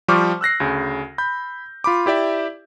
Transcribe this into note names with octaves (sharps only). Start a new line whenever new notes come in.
F3 G3 C5 C#6 D6 F6
E6 F#6 A#6 C7
D2 C#3
B5 G6
F4 B5 D6
E4 G4 D5 E5